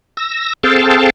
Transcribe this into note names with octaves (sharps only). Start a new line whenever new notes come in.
E6 A#6
C4 G#4 A4 F5 G5 A5